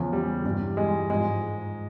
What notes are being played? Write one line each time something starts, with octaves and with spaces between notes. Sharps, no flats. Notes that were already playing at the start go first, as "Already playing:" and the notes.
Already playing: E2 C#3 F3
G3
G2 E3 G3
G#3
G#2 F3 G#3